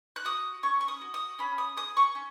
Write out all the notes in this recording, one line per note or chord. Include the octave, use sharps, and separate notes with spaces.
F#6
F#4 D#6
C#4 C#6
C#6
D#6
F#4
D#6
C#4 B5
D#6
G#4 D#6
C#6
C#4